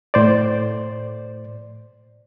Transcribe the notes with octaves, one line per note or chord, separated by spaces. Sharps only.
A2 C5 D5